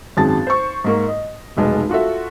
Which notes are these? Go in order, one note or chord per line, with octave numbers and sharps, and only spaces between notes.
G#1 F#2 C4 G#4 A5 A6
C5 C#6
G#2 A#3 C#6
D#5
F1 B1 G#3 A5
F4 F#4 A4 E5